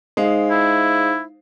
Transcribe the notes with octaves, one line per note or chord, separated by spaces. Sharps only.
G#3 D#4 C5 F5
E4